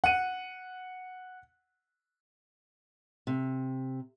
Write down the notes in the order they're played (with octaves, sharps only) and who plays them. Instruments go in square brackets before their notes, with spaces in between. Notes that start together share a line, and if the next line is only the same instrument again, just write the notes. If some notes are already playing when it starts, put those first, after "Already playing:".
[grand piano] F#5 D#7
[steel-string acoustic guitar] C3